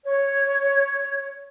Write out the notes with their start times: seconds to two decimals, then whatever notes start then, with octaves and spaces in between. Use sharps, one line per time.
0.05 C#5